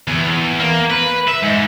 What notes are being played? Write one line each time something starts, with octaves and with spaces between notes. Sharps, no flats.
E2
A#3
B4
E5
G#2